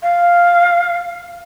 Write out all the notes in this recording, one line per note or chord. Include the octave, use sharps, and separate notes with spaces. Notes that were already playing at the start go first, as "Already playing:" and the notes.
F5